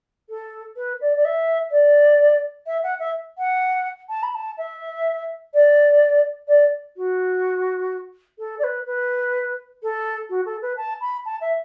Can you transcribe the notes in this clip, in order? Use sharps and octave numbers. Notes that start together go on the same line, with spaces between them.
A4
B4
D5
D5
E5
D5
E5
F#5
E5
F#5
A5
B5
A5
E5
D5
D5
F#4
A4
D5
B4
B4
A4
F#4
A4
B4
A5
B5
A5
E5